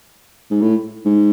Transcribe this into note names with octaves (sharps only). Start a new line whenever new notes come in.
G#2
A2
G#2